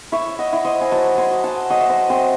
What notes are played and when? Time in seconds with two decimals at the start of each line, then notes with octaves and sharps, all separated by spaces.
0.12 E4 C#5 E5
0.39 D#5 F#5
0.53 E4
0.65 C5 D#5
0.81 G#5
0.91 F#3 F#5 A5
1.18 G#5 C6
1.31 F#3
1.44 F#5 A5
1.70 F#3 D#5 F#5
1.81 E5
1.89 C5 D#5
2.09 C4 C5 D#5